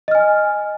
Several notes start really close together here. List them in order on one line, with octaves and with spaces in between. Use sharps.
D#5 F6 G#5